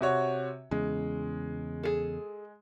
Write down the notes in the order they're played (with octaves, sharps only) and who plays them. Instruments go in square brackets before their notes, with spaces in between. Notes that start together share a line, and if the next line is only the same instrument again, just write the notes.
[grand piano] C3 F#4 C#5
[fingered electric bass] E2 C#3 [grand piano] G#3
[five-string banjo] G#4 A4